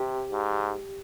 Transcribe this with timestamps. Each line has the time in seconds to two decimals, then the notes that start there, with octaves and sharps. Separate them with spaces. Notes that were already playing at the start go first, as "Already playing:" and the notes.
Already playing: C3 G4
0.31 G#2